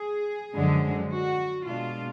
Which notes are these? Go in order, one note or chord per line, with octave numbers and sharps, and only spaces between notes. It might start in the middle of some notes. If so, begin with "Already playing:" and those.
Already playing: G#4
F#2 D3 F3 G#3
F#4
B2 G#3 D4 F4